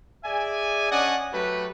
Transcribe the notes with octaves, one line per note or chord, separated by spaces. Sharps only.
G#4 D5 E5 G#5
C#4 D4 D5 D#5 F#5 G#5
F#3 A3 F#4 G4 B4